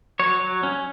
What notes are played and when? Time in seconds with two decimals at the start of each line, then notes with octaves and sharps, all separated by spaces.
0.20 F#3 C#5
0.41 F#3
0.63 C#4